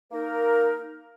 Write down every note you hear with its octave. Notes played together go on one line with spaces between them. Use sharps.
A#3 D#4 A#4